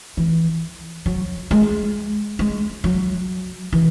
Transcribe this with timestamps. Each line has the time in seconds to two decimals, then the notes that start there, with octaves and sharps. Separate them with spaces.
0.17 E3
1.06 F#3
1.51 G#3
2.39 G#3
2.84 F#3
3.73 E3